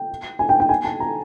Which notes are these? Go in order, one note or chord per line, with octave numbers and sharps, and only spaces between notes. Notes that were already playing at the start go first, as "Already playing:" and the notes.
Already playing: G5
G#5
G5
G5
G#5
A5
A#5